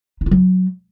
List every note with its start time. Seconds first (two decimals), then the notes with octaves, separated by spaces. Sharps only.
0.21 D#4
0.26 F4
0.31 F#3